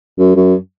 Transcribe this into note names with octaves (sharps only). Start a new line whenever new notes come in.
F#2
F#2